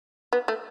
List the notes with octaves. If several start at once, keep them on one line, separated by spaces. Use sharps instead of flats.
B3
A3